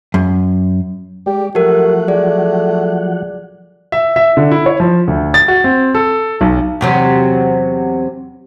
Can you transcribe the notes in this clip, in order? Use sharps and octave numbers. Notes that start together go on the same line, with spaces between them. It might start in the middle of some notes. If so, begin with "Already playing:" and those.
F#2
G#3 G4 D5
F3 F#3 A3 G4 A#4 F#5
G#4 D5
E5
E5
D3
E4
C#5
F3
D2
A6
F#4
C4
A4
B1
E2 C3 F#3